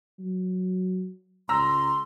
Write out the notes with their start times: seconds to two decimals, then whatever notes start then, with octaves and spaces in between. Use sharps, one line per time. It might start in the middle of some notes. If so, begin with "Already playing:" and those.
0.19 F#3
1.49 C#2 A#5 C6 E6 A#6